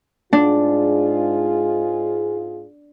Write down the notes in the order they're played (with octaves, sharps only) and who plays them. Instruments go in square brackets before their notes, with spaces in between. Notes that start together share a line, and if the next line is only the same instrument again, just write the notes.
[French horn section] G#2 F4 G#4 [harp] D4